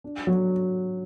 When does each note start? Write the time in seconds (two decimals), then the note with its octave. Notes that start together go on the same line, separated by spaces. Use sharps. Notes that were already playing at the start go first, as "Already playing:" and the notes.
0.04 D4
0.27 F#3